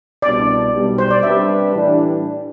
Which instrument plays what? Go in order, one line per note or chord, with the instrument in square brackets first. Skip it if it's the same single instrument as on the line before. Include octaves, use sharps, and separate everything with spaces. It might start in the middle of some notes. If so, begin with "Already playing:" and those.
[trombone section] C2 B2 G3 D4 [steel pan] D5
[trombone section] B1 B2 G3
[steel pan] C5
D5
[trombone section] C3 G3 D4 G4 B4 [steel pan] E5
[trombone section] A2 E3 G3 D4